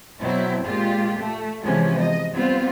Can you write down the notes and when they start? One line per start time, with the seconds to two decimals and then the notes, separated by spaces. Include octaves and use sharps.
0.19 B2 F#3 C4 E4
0.63 A#2 G#3 F4 G4
1.19 A3
1.62 C3 E3 F3 G#3 B3 C#4
1.99 D#5
2.33 G3 B3 C4 F4